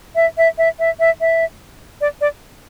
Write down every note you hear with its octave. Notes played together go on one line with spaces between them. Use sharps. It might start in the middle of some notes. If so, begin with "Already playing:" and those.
E5
E5
E5
E5
E5
E5
D5
D5